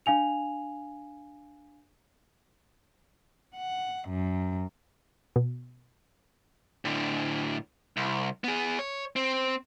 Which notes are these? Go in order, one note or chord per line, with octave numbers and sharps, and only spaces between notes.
D4 F5 G#5 F7
F#5
F#2
B2
A2 D3
C2
B3 G#4
C#5
C4